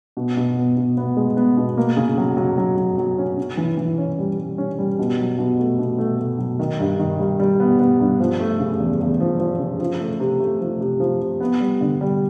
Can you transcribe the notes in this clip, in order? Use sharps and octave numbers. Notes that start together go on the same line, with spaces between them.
B2
B2
B3
B2
B3
G#3
B3
B2
A#3
C#3
F#3
F#3
F#3
F#3
F#3
C#4
C#4
E3
E3
C#4
G3
G3
C#4
G3
B2
F#3
B2
A3
B2
A3
A3
F#3
D#3
G2
D#3
G3
G3
B3
B3
G2
F3
A3
C#3
E2
E2
F3
F3
C#3
F3
A3
C3
A3
F3
C3
F3
C3
B3
G3
D3
G3